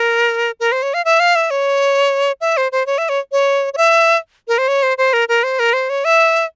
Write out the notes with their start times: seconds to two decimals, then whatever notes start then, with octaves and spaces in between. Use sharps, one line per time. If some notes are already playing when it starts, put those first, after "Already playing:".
Already playing: A#4
0.60 A#4
0.72 C5
0.83 C#5
0.94 F5
1.05 E5
1.20 F5
1.36 E5
1.51 C#5
2.41 E5
2.57 C5
2.72 C5
2.86 C#5
2.98 E5
3.09 C#5
3.32 C#5
3.74 C#5
3.77 E5
4.48 A#4
4.58 C5
4.68 C#5
4.83 C5
4.98 C5
5.13 A#4
5.29 A#4
5.43 C5
5.59 A#4
5.73 C5
5.90 C#5
6.05 E5